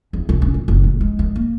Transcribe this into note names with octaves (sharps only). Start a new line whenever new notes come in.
E2
C2
C#4
E1
F#1
A2
G#3
D#3
A#3